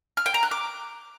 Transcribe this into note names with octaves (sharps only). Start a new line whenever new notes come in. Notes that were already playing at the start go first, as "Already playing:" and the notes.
F6
G5
A#5
F#6
D6